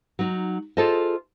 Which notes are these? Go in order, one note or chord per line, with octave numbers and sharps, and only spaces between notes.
F#3 D#4
F4 G#4 A4 C5 D#5